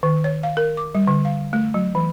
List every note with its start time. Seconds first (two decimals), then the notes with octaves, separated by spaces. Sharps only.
0.03 D#3
0.24 C#5
0.43 F5
0.57 A#4
0.77 D6
0.95 G3
1.07 D3
1.25 F5
1.53 A3
1.74 F#3
1.95 E3